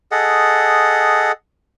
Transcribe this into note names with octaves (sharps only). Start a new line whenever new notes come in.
G#4 A4 D#5 F#5